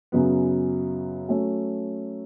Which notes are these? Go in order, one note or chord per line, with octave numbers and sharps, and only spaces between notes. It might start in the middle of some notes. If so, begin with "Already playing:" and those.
F#2 C#3 F#3 B3
F#3 A3 C#4